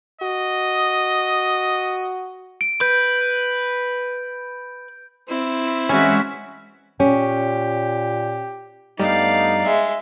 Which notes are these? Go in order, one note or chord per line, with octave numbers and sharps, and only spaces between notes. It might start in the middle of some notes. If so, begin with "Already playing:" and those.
F#4 D#5
D7
B4 G6
C4 E4
E3 G#3 C#4 F#4 E5
A#2 C#4 G4
G2 G3 A3 B3 D#4 D5 F5
G#3 E5